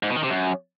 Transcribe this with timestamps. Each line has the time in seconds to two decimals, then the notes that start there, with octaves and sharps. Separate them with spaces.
0.03 G#2
0.10 B2
0.16 D#3
0.23 C3
0.30 F#2